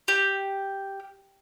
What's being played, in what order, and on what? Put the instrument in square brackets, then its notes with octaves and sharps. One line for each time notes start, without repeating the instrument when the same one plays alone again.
[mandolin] G4